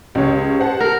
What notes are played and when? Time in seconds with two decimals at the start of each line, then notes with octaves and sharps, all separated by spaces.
0.15 C#2 C#3 G4 C#5
0.59 C5 F#5 A5
0.81 A#4